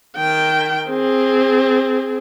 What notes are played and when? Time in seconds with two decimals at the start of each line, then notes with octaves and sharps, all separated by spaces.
0.17 D#3 G5
0.89 C4 G#4